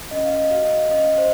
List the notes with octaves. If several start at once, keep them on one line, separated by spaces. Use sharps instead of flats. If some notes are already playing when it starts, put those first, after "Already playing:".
C#4 D#5
F5
D#5
F#4 F5
D#5
F5
C#4 D#5
F5
C5 D#5